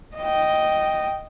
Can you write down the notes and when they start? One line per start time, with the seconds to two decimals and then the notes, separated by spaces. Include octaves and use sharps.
0.17 D#5 G5